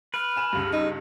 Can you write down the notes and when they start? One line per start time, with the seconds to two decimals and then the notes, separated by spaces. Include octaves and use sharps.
0.14 B4 F6
0.36 G#5 E7
0.53 C#2 G2
0.73 D#4